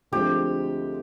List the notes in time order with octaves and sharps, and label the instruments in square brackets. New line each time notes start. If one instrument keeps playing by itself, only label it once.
[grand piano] D2 D3 F3 G#3 C4 [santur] G4